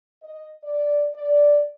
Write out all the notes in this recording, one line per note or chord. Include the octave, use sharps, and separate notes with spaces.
D#5
D5
D5